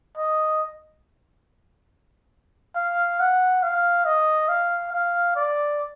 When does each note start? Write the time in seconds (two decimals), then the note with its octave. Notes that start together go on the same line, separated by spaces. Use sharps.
0.17 D#5
2.76 F5
3.20 F#5
3.63 F5
4.05 D#5
4.49 F5
4.92 F5
5.36 D5